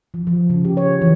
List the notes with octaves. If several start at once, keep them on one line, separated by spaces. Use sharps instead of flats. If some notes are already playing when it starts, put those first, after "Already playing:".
F3
F3
C#3
G4
C#5
E3